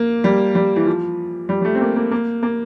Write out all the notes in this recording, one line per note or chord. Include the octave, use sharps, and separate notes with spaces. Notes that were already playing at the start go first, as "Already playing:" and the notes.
Already playing: A#3
G3
G3
E3
F3
G3
G3
A3
C4
A#3
A#3
A#3
A#3